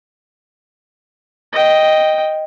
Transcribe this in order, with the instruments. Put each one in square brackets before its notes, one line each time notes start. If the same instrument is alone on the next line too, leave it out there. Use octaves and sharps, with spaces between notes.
[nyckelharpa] D#5 G5